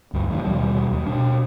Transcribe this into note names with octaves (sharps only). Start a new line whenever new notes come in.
D2 G2
F2 A2 D#3
D#2 B2 F#3 G3
D#2
B2 D4